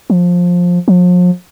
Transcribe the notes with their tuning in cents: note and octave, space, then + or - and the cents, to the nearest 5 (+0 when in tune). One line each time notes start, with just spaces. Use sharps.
F3 +15
F3 +40